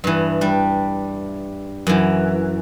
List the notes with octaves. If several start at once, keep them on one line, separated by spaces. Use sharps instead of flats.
G2 E3
G3 D4
F#2 E3